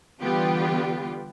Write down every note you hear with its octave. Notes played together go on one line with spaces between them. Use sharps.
D3 E3 G3 B3 F4 G4